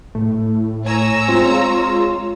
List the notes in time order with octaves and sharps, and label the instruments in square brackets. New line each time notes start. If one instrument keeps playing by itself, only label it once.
[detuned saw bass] A2 [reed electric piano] A3
[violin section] C#5 A#5 E6 [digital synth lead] G#5
[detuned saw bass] G#3 [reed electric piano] C4 [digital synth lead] F4